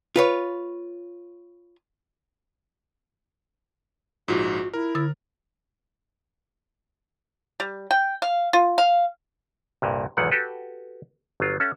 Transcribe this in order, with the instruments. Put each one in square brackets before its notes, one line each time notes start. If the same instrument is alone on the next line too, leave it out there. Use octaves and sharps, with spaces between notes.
[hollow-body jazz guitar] F4 B4 C#5
[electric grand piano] A#1 G#2 [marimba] F4 [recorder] F#4
[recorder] E4 [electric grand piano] A#4
[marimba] D3 E6 A6
[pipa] G3
G5
F5
F4
F5
[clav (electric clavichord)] C2 G2 A#2
B1 E2 G#2 D#3 E3 F#5
F#4 G4 A4 B4
G1 F#3 F4
C#4 A4 E5 F#5